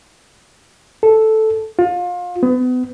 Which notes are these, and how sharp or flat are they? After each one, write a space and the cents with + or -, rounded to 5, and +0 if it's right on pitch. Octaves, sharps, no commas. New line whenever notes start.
A4 -5
F4 +30
B3 +35